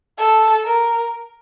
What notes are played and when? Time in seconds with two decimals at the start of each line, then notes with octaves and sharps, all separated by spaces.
0.18 A4
0.65 A#4